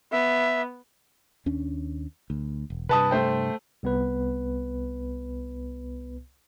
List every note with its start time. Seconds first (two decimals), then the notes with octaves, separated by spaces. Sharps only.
0.12 B3 E5
1.46 D#2 C#4 D4
2.30 D2
2.70 E1
2.89 G2 C3 B4 A5 D#6
3.11 A3 C5 G5
3.83 C2 B3 B4